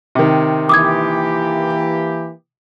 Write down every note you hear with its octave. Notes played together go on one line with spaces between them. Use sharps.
C3 D#3
E3 A#3 G4 D6 D#6 G#6